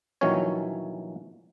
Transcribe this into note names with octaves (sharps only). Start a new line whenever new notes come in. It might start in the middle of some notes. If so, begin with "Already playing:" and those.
A#1 D#3 E3 F#3 C#4 C#5